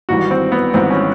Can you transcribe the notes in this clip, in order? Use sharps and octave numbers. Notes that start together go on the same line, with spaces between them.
G#1 G#2 E3 G3 F#4
C4
B3
G#1 G#2 E3 G3 C4
C#4